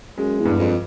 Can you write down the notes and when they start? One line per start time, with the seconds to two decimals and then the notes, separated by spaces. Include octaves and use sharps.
0.18 F#2 G#3
0.39 E2
0.45 G2
0.59 F2